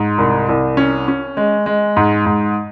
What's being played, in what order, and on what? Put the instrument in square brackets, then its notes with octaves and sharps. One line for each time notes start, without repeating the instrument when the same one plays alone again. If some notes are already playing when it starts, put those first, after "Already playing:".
Already playing: [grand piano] G#2
C2
C2
C#4
C#4
G#3
G#3
G#2
G#2